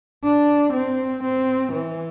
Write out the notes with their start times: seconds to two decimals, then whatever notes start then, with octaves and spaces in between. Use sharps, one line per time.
0.24 D4
0.73 C4
1.23 C4
1.72 E3